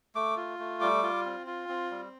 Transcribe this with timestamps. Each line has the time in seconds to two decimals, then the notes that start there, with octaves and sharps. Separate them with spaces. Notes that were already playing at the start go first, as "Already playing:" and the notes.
0.15 A3 D6
0.37 F4
0.59 A3
0.81 G3 D6
1.03 F4
1.25 C4
1.47 F4
1.69 C4
1.91 G3